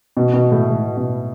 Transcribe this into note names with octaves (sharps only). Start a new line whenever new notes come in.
B2
B2
A2
A2
B2